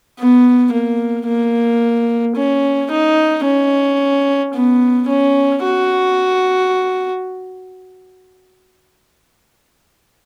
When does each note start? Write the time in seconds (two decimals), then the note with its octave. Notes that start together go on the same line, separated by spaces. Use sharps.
0.19 B3
0.72 A#3
1.26 A#3
2.36 C#4
2.91 D#4
3.44 C#4
4.54 B3
5.08 C#4
5.63 F#4